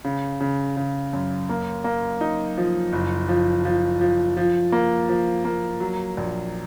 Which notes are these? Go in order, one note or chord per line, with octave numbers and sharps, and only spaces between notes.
C#3
C#3
C#3
F#2
A#3
A#3
D#4
F3
F#1
F3
F3
F3
F3
A#3
F3
A#3
F#3
A#1